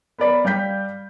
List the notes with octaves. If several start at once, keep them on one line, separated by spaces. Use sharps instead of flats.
B3 A#4 D5 B5
G3 F5 G5 G6 B6